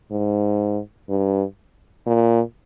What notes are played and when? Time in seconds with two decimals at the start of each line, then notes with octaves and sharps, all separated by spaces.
0.11 G#2
1.09 G2
2.07 A#2